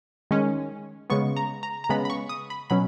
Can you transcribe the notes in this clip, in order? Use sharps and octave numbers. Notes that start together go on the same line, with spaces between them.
D#3 G#3 C#4
C#3 G#3 B3 C#6
A#5
A#5
A#5
C#3 G#3 B3 B5
B5
C#6
D#6
B5
B2 F#3 C#4 B5